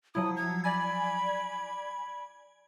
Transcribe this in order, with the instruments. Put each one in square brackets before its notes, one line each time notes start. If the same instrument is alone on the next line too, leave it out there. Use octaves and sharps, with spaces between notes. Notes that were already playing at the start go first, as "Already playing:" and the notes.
[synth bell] F3 F#3 E4 [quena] D#6
[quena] G#6
[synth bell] D5 G#5 G#6 [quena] B5